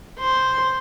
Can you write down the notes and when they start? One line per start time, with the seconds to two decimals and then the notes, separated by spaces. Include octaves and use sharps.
0.18 C5